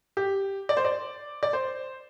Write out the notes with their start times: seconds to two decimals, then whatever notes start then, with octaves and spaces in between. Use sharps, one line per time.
0.17 G4
0.69 D5
0.77 C5
0.85 D5
1.43 D5
1.53 C5